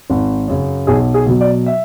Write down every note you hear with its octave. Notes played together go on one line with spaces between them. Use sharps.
G#1
F#2 C#3
B1 G#4
G#4
B2 F#3
D5
E5